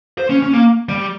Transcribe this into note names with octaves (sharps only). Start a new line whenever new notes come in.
C5
C#4
C#4
A#3
G3